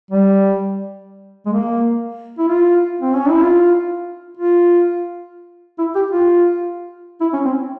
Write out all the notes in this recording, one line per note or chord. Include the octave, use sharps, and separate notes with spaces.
G3
G#3
A#3
E4
F4
C4
C#4
E4
F4
F4
E4
G4
F4
E4
C#4
C4